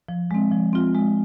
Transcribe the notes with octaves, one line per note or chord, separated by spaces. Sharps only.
F3
G#3 C4
F3
C4 F4
G#3